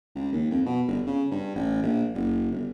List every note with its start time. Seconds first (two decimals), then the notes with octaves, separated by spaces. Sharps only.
0.15 C#2
0.33 D#2
0.51 F2
0.66 B2
0.87 G1
1.06 C#3
1.31 G2
1.56 A1
1.83 A#1
2.14 F#1
2.52 G1